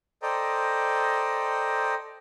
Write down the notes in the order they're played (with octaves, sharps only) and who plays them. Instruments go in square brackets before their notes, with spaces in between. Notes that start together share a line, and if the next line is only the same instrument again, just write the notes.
[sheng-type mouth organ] A4 C5 D5 D#5 G5 A#5